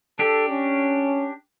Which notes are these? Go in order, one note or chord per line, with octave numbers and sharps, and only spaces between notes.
D4 G4 A4
C#4